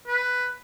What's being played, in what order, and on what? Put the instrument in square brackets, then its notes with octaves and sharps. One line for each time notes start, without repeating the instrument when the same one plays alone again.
[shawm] B4